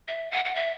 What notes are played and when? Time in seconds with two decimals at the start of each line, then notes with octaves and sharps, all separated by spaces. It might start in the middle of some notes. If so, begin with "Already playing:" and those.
0.08 E5
0.31 F#5
0.45 F#5
0.55 E5